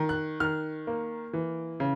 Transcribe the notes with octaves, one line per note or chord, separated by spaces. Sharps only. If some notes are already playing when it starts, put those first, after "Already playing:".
Already playing: D#3
F#6
D#3 F6
A#3
E3
C#3